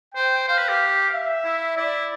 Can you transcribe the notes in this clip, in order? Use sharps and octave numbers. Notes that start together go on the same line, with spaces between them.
C5 G5
C5 F5
B4
G4
E5
E4
E4 D5